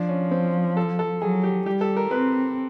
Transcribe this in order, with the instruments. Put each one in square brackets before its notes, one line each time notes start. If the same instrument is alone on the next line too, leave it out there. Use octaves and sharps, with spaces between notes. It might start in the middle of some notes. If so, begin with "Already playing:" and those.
Already playing: [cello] F3 [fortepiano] D4
[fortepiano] C#4
C4
A4
A4
[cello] F#3 [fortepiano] G#4
[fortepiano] G4
[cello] G3 [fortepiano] G4
[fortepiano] A4
A#4
[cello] C4 [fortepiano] B4